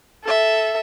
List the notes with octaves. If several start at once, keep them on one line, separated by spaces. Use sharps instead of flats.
A4 E5